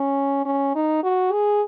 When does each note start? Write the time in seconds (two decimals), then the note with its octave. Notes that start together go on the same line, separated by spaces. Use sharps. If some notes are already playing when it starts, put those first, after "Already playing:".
Already playing: C#4
0.45 C#4
0.75 D#4
1.03 F#4
1.32 G#4